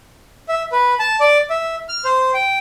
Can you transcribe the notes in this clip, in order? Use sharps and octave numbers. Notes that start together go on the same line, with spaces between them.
E5
B4
A5
D5
E5
F6
C5
G5